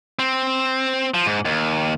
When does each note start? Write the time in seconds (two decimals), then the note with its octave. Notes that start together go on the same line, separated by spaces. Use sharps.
0.19 C4
1.14 F3
1.26 G#2
1.45 D#2